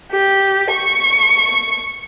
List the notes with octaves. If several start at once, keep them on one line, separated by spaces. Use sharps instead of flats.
G4
C#6